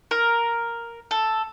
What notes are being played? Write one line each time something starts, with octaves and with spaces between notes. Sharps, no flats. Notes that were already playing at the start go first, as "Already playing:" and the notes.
A#4
A4